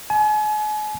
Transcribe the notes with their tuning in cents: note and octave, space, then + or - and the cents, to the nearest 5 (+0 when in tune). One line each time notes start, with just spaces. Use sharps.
G#5 +40